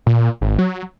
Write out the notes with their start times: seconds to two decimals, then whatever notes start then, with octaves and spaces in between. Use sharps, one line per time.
0.07 A#2
0.41 G#1
0.59 F#3